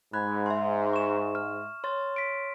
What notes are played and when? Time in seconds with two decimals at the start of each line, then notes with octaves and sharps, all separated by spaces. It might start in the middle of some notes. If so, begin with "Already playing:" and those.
0.13 G#2 B5 F#6 G#6
0.46 E5 C6
0.93 C#6 E7
1.35 F6
1.84 C#5 C6 A6
2.16 B6 D7